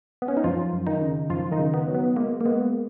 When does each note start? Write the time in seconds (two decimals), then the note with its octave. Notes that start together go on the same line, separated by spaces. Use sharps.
0.22 B3
0.28 C#4
0.37 D#4
0.44 F#2 F3 F4
0.73 F#2
0.87 D#3 D#4
1.02 C#3
1.30 F#2 F3 F4
1.52 D#3 D#4
1.59 C#3
1.74 B3
1.88 F#3
1.95 B3
2.16 G#3 A#3
2.41 A#3
2.46 G#3 B3